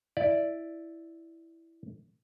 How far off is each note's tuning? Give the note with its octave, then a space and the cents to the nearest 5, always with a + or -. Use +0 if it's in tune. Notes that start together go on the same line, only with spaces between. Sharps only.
E4 +0 D5 +0